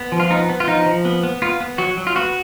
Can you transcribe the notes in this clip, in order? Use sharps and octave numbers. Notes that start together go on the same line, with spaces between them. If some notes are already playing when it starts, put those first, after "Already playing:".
Already playing: B3
F3
F4
B3 D#4
B3
F4
F3 D#4
F3
B3
B3
B3 F4
B3
F#3 F#4
F#3
F4
B3 F#4